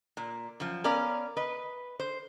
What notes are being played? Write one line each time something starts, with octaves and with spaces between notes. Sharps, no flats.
A#2
F#2 F3
B3 C#4 A#4 D5 F5
B4 D#5
C5